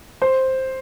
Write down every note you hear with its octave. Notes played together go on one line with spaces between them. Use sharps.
C5